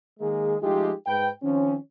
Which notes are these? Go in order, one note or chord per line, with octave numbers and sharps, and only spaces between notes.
D#3 G#3 A#3 G#4
F3 G#3 A3 D#4 F4 G4
G#2 B4 G5
D#3 F3 C4 C#4